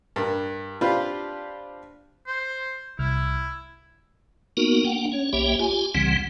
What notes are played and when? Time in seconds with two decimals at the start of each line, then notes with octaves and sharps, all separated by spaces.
0.16 G2 A#4
0.81 C4 D4 F4 G4 B4
2.27 C5
2.99 C2 E4 F6
4.57 A#3 B3 D#4 F#4 A#4
4.85 A#3 D4 F#5 G5
5.12 C#4 C#5
5.33 B1 A#3 G4 C#5 E5 G5
5.59 F4 G4 G#5
5.95 C2 C#3 E3 G3 C4 F#5